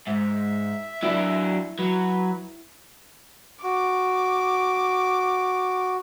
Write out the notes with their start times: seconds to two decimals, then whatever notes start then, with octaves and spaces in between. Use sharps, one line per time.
0.07 G#2 E5
1.03 F#3 D4 E4
1.79 F#3 B4
3.63 F#4 D6